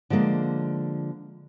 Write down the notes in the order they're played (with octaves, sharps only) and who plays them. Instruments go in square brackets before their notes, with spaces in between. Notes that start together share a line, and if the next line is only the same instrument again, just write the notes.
[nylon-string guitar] D3 F3 G#3 A#3